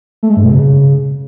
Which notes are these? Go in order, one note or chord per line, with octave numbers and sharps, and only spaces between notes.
A3
G#3
G2
B2
C#3